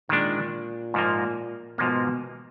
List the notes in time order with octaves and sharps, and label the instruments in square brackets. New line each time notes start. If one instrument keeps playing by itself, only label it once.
[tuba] A#2 [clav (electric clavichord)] D#3 G#3 D4
[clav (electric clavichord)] G#2 F3 A#3
[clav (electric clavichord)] G#2 F3 A#3 [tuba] B2